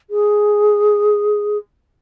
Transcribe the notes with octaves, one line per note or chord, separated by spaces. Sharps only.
G#4